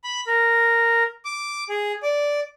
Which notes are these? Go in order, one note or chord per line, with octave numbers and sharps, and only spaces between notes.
B5
A#4
D6
G#4
D5